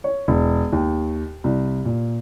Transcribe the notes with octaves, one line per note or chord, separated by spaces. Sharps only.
C#5
E1
D#2
C2
A#2